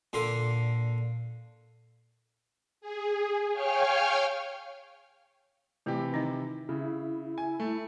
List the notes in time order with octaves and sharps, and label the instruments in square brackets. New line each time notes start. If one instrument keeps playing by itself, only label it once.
[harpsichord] A#2 D3 C6
[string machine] G#4
C#5 F5 G5 G#5 C#6 F6
[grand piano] C3 E3 G4 [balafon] A3 C4
[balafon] D#3 D#4 D#5
[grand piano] C#3 [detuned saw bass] E4
[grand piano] G#5
A3